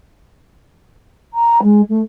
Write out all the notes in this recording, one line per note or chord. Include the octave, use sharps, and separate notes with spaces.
A#5
G#3
A3